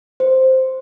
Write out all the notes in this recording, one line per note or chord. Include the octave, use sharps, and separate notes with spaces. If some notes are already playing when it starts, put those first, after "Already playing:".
C5